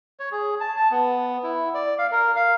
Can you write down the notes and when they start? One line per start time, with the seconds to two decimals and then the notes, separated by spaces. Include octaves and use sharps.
0.20 C#5
0.32 G#4
0.61 A5
0.77 A5
0.91 B3
1.43 E4
1.74 D5
1.98 F5
2.12 A#4
2.36 F5